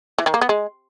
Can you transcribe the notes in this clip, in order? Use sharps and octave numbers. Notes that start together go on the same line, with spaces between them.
E3
D#3
A#3
B3
G#3